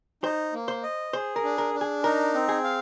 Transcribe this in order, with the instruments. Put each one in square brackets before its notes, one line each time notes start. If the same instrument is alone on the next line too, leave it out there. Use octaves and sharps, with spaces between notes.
[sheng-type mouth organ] D#4 [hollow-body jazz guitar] C5
[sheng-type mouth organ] A#3
[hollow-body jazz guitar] C5
[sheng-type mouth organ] D#5
[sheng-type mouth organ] G#4 [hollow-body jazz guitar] C5
[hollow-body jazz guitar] A#4
[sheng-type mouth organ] D4
[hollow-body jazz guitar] A#4
[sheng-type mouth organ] D4
[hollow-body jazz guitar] G#4
[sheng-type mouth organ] D#4 [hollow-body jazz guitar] A#4
[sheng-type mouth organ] C4
[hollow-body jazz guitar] G#4
[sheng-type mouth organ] F5